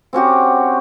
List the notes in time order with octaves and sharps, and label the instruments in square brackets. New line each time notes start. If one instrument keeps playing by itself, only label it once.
[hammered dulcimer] C4 C#4 F#4 G4